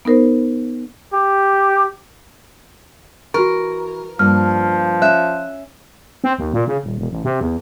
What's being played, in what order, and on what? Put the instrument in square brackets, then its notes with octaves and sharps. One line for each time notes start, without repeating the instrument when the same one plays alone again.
[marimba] B3 D#4 A#4 C5
[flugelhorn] G4
[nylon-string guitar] E3 [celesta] F#4 C#6 [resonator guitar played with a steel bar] A#4
[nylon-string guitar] G2 A#3 [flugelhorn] F3 [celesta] F6
[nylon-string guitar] C#4 [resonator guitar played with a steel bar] E5 [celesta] F#6
[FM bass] C4
D#2
A#2
C#3
D#1
E1
A1
C3
E2